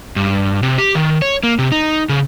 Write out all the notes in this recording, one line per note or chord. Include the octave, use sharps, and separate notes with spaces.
G2
C3
G4
D#3
C#5
A#3
C3
D#4
C#3